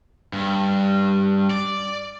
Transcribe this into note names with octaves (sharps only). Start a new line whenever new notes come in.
G2
D5